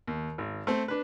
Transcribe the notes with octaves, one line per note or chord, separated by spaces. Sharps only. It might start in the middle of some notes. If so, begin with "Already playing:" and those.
D#2
G#1
A3 C4
D4 B4